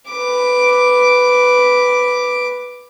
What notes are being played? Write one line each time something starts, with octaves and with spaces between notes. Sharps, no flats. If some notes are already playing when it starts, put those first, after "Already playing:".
B4 D6